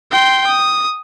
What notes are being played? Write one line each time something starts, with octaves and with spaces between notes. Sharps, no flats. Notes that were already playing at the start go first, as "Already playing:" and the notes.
G5 C6
D#6